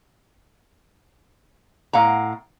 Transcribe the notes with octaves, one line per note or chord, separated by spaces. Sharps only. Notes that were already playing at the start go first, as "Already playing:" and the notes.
A2 F5 F#5 A#5